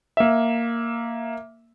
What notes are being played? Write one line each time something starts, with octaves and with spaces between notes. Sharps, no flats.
A#3 E5